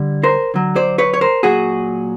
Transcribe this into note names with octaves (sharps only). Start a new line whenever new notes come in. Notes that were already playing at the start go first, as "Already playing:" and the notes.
Already playing: D3 G3
A#4 C5
D3 F#3
C5 D5
B4 C#5
C#5
A#4 C5
A#2 F#3 F#4 G#4